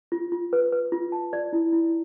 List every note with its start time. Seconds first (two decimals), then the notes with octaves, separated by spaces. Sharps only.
0.12 F4
0.32 F4
0.53 B4
0.72 B4
0.92 F4
1.12 A5
1.33 D5
1.53 E4
1.73 E4